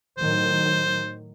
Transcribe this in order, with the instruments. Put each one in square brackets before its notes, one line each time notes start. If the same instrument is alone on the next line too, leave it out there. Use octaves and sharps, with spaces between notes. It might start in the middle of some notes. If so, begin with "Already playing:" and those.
[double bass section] A2 D#3 F#3 [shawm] C5